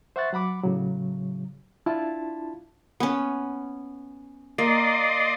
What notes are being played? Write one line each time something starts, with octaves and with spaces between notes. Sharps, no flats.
C5 E5 F#5 C#6 F#6 A6
F#3 F#5 B5 D6
A2 C#3 F#3
D4 E4 F4 A5
B3 C#4
A#3 D5 D#5 C6